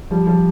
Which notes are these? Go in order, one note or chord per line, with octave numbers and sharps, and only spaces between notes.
F3 G3
F3 G3